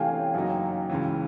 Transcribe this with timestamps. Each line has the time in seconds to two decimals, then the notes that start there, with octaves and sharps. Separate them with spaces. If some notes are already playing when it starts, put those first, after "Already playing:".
Already playing: C3 E3 A3 F5 G5 G#5
0.34 F#2 C#3 F#3 A#3 D#4
0.90 C#2 C#3 E3